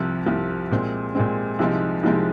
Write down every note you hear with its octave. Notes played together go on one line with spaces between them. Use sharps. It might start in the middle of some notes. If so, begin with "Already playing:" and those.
Already playing: C2 C3 F3
C2 C3 F3
A#2 G#3 C4
A#2 G#3 C4
C2 C3 F3 G#3 D#4
C2 C3 F3 G#3 D#4